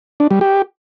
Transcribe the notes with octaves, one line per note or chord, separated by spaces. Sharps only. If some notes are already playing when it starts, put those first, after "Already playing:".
D4
G3
G4